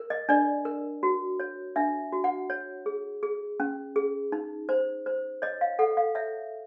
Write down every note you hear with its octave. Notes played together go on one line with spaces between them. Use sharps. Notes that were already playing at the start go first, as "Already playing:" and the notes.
Already playing: A#4
D#5
D4 D5
A#4
F#4
C#5
D4 E5
F#4
F#5
C#5
G#4
G#4
C#4
G#4
D#4
C5
C5
C#5 D#5
F5
A4 F#5
F5
C#5 E5